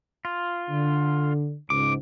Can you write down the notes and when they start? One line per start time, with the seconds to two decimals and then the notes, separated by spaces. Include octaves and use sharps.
0.25 F4
0.70 D3
1.70 C#2 G#2 D6